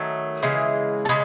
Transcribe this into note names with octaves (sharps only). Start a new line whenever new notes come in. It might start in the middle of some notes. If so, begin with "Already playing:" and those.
Already playing: D#3 F#3 A3
C#3 E3 G#3
A4
C#3 G#3 B4